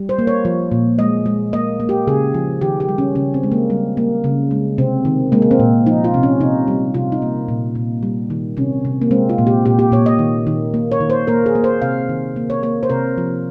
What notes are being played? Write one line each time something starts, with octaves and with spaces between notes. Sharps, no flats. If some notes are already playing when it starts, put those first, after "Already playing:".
Already playing: G3
C5
A#3
C#5
F3
A#2
G#3 D#5
G#3
A#3 D#5
A#3
G4
C#3 G#4
F3
D#3 G4
G4
G3
C#4
C#3 C#4
C4
G#3
A#3
G3
A#3
C#3
G#3
C3 C4
D#3
G#3 A#3
A#3
C4
A#2
F3 D#4
F4
C3
C#4
C3 D#4
G3
C3 F4
D#4
A#3
A#2
A#2
G3
D#3
C3 C#4
C3
A#3
G#3 C4
F4
A#2
G4
A#2 G4
G4
A#2 C#5
D#5
D#3
D#3
A#3
C#5
D#3
C5
A#3 A#4
G#4
A#3
C5
C3 F5
D#3
A#3
C#5
A#3 C#5
C5
C3 A#4
F3